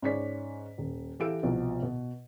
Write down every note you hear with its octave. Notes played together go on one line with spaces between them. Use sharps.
G#2 C#4 C#5 D5 B6
D#1
E3 G4 A4 F5 E6 D7
C2 B2 F3
B2